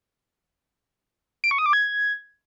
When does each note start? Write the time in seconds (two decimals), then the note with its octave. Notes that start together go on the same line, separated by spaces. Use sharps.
1.44 D7
1.51 C#6
1.58 D#6
1.66 D6
1.73 G#6